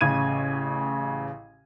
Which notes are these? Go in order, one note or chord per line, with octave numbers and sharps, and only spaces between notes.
A1 C#3 G#6 D#7